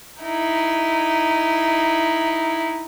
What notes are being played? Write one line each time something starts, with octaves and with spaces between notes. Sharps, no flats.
D#4 E4